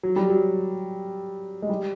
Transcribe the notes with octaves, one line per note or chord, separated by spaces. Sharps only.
F#3
G3
F#3
G#3
G3